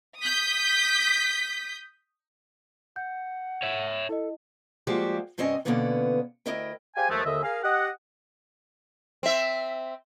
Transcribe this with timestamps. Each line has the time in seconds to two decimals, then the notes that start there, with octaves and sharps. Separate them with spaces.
0.20 D#6 G6 B6
2.96 F#5 G6
3.62 C#5 E5
4.09 E4 A4 D#5
4.87 F3 G3 G#3 A#3 F#4 G4
5.38 G2 C3 C4 C#4 D#5 G#5
5.65 B2 D3 E3 A#3 B3 C#4
6.46 D2 E4 A#4 D#5 E5 G5
6.96 G4 G#4 C5 F5 G#5
7.09 D#2 F3 G#3 A3
7.25 D#2 D3 D#5 E5
7.43 G#4 A#4 F5
7.64 G4 D#5 F#5
9.23 C4 E5